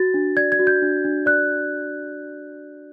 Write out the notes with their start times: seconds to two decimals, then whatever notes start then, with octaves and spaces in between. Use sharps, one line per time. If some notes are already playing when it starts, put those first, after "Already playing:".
Already playing: F#4 A6
0.14 D4
0.37 D5 G#6
0.52 G#6
0.59 F#4
0.67 G6
0.82 D4
1.05 D4
1.26 D5 F#6